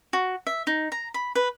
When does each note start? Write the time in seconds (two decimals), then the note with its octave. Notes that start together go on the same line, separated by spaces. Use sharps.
0.13 F#4
0.47 E5
0.67 D#4
0.92 A#5
1.14 B5
1.35 B4